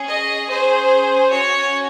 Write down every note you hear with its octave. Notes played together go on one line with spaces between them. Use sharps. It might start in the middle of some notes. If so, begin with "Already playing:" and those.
Already playing: C#4 G#4
D#5
C#4 G#4 C5
C#4 F#4 C#5